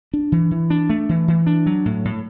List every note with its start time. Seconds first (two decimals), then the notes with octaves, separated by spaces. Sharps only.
0.13 D4
0.32 E3
0.51 E3
0.70 D4
0.90 A3
1.09 E3
1.28 E3
1.47 D4
1.66 F#3
1.86 A2
2.05 A2